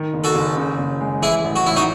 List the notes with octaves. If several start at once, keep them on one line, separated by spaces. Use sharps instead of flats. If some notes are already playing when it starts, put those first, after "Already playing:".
Already playing: D#3
F#1
F#4 A4
F#1
C#3
F#1
G#3
E3 E4 G#4
A1
F#4
A1 E4
D#4 F#4